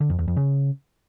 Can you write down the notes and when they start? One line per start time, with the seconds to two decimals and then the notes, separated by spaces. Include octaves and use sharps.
0.01 D3
0.10 F2
0.19 E2
0.28 F2
0.37 C#3